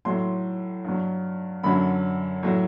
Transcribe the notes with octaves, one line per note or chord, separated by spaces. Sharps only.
A2 F#3 C6
G2 F#3
F#2 D3 F#3 B5
A2 F#3